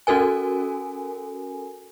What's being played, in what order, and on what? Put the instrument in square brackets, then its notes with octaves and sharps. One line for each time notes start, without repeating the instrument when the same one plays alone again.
[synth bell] C#4 F#4 A4 A#4 G#5